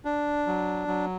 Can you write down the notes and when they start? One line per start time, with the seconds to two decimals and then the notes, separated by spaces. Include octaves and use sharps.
0.05 D4
0.47 F#3
0.88 F#3